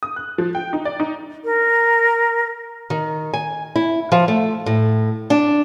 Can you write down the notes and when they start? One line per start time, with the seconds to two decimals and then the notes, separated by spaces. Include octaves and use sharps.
0.03 D#6
0.16 F#6
0.38 F3
0.55 G5
0.73 D#4
0.85 D5
1.00 D#4
1.44 A#4
2.90 D#3
3.34 G#5
3.76 E4
4.12 F3
4.28 A3
4.66 A2
5.30 D4